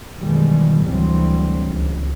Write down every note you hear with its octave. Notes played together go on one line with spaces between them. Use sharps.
F#2 B2 D#3 E3 G3 G#3
D2 C3 E3 F#3 G3 C4
C#2